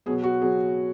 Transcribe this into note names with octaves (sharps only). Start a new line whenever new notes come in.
B2 F#3 B3 G#4
F#4
F#3 B3 G#4